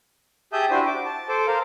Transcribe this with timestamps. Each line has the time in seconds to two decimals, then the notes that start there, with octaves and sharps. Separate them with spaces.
0.53 G4 G#4 E5 A5 D#6 G6
0.70 D4 E4 F#4 G4 C5
0.86 D6
1.06 A5
1.29 A4 C5 D6
1.47 A#4 C5 F5